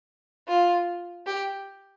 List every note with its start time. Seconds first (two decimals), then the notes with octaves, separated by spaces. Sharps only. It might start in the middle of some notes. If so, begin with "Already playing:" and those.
0.48 F4
1.27 G4